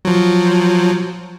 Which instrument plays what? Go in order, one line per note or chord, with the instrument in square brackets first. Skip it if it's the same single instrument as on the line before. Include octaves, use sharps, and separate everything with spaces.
[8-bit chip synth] F3 F#3